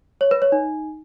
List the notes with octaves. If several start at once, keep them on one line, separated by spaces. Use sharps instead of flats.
C#5
B4
C#5
D#4